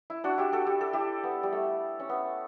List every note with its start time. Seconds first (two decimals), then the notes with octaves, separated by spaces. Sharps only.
0.10 E4
0.24 D4 F#4
0.38 E4 G4
0.53 F#4 A4
0.67 G4
0.81 A4
0.93 E4 G4
1.24 B3
1.43 G3
1.53 A3
1.99 C#4
2.09 B3